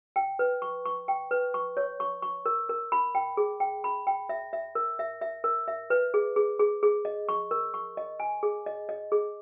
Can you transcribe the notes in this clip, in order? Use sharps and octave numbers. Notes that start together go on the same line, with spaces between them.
G5
B4
C#6
C#6
G5
B4
C#6
C#5
C#6
C#6
A#4
A#4
B5
G5
G#4
G5
B5
G5
E5
E5
A#4
E5
E5
A#4
E5
B4
G#4
G#4
G#4
G#4
D#5
C#6
A#4
C#6
D#5
G#5
G#4
D#5
D#5
G#4